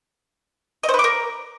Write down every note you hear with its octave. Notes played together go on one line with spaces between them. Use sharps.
D#5
C5
B4
D6
A#4